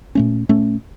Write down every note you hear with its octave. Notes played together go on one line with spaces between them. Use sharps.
A#2 A3 C#4
A#2 A3 C#4